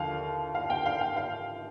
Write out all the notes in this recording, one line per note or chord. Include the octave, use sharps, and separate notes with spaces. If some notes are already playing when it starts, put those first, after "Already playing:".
Already playing: D#2 D3 F3 F5
F5
G5
F5
G5
F5